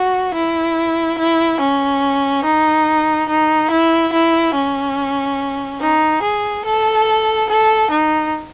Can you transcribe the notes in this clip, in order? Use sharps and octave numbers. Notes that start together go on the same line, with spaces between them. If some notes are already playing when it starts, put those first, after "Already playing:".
Already playing: F#4
E4
E4
C#4
D#4
D#4
E4
E4
C#4
D#4
G#4
A4
A4
D#4